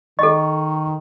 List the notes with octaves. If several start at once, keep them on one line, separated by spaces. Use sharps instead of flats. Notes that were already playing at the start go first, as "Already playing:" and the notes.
D#3 A4 D#5 C#6